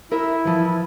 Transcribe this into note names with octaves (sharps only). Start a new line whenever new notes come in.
E4 A#4 D#5 E5
E3 F3